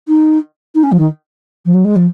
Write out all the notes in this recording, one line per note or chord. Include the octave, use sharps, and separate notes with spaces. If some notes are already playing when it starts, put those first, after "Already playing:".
D#4
D#4
C#4
F3
D#3
F3
F#3
G#3
F3